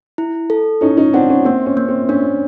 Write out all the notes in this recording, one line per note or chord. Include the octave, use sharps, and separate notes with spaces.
E4
A4
C#4 D#4 E4
C#4 D#4
C4 D4 F#5
C#4
A#3 C4
C#4
A#3
C4
C#4 D4